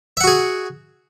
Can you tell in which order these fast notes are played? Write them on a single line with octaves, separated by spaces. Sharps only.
E5 F#5 F#4 G#4